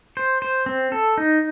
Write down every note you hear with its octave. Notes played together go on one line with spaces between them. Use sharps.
C5
C5
C4
A4
D#4